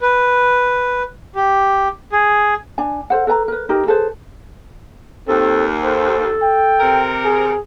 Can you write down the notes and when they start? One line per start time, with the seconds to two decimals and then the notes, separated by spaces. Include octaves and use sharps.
0.01 B4
1.36 G4
2.12 G#4
2.78 D4 G#5
3.10 A4 C5 F#5
3.27 A4 B4 G#5 A#5
3.48 A#4 B4
3.69 D#4 G4 A#4
3.87 G#4 A4 B4 C5
5.28 D#2 C4 A4
5.83 A4 C5
6.42 G5
6.80 C3 A#4
7.24 G#4